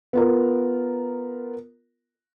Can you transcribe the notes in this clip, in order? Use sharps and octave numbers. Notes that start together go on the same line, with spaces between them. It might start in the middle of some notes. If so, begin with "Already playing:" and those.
B3 F4 A#4